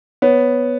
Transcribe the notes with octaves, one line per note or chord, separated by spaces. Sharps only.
B3 C#5